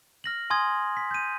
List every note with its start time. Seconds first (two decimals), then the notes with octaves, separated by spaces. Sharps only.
0.24 F6 A#6 F#7
0.50 G#5 C6 D#6 G#6
0.97 B6
1.11 G6 D#7